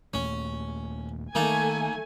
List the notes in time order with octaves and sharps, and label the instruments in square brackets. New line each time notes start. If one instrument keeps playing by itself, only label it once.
[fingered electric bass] D#2 A#2 A3 [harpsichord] C#4
[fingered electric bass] D#3 [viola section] A3 G#5 [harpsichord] A#3 D#4 A5